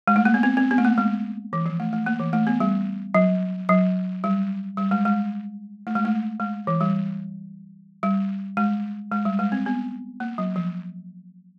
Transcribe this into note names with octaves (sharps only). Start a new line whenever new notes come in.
G#3
A3
A#3
B3
C4
C4
B3
A3
A#3
G#3
E3
F3
A3
A3
A#3
E3
A3
B3
G3
F#3
F#3
G3
G3
G#3
G#3
A3
G#3
A3
G#3
E3
G3
G3
G#3
G#3
G3
G#3
C4
B3
A#3
F#3
F3